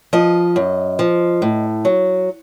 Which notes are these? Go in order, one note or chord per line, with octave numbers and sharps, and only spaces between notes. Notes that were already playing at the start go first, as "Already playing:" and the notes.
F3 D#5
F#2
F3
A2
F#3